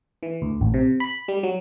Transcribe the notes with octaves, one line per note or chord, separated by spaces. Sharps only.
E3
D2
A1
C3
B5
G3
F#3